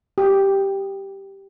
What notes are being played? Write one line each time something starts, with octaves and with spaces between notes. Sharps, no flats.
G4